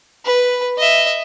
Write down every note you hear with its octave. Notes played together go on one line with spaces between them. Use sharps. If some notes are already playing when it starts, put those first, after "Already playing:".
B4
D#5 E5